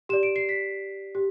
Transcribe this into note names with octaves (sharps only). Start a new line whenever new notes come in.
G4 D5 E7
D7
C7
B6
G4